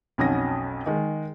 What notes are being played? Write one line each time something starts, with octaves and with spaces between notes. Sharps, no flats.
B1 F2 C#4 F#4 D#6 A#6
D#3 G#3